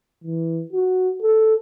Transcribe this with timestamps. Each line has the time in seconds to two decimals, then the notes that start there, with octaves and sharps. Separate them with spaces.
0.24 E3
0.73 F#4
1.22 A4